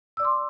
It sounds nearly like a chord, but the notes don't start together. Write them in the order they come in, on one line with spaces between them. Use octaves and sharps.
E6 D5 D6 C6